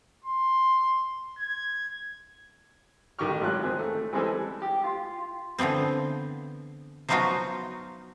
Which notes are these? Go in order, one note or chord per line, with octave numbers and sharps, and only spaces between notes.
C6
G#6
A1 D#3 G4 G5 C#6 F6
G#1 F#3 G#3 F4 F#6
D#3 C4 G#4
A3
E3 G3 G#3 C4 G#4 A4
G4
F4
D3 E3 F3 B3 C4
F3 F#3 B3 D#4 F4 F#4